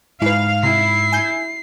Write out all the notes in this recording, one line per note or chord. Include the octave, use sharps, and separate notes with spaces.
G#2 E4 B4 F5
C3 E4 C7
G#5 G6